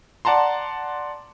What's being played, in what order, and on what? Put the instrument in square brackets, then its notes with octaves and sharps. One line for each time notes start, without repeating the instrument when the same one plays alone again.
[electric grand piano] D5 F#5 A5 A#5 C6